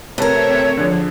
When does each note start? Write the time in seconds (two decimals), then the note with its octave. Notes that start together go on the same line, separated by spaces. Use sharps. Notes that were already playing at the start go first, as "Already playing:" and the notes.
0.18 C3 A3 C4 A#4 B4 C#5 E5 A5
0.77 D3 F3 D4 G#4